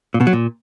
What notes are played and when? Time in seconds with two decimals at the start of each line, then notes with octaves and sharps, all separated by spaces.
0.14 A#2
0.21 B2
0.27 F#3
0.33 A#2